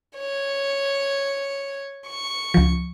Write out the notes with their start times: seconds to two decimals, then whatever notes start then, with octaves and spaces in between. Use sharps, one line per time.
0.17 C#5
2.08 C#6
2.54 C#2 F3